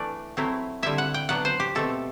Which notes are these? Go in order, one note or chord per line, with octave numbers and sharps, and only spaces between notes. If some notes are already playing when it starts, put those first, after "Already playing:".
Already playing: E3 A3 D4 D5
F#3 A3 C4 E4
D3 G3 C4 E4 E5
F#5
G5
F#3 B3 D4 F#5
C5
G4
B2 A3 C4 A4